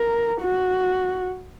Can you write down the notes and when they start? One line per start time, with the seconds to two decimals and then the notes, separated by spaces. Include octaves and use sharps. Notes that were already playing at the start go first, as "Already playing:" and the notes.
Already playing: A#4
0.42 F#4